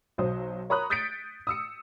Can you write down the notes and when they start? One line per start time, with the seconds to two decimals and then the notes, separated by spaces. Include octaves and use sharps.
0.18 B1 F#3 C5 D#6
0.69 A#4 C#5 A#5 B5 D#6 F#6
0.90 D#6 G6 A6 B6 C#7 D7
1.47 D#6 E6 C#7